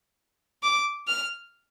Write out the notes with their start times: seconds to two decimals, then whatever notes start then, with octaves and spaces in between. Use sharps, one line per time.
0.63 D6
1.08 F6